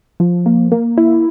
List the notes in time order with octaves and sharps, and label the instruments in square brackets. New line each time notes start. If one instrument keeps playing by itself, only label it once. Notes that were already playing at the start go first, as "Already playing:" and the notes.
[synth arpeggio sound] F3
A#3
A#3
E4